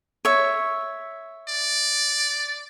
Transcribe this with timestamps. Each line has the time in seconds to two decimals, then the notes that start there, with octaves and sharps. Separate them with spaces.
0.25 C#5 E5
1.49 D5